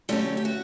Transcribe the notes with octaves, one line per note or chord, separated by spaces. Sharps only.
D3 F#3 G3 A3 C#4 G4
G4
F#4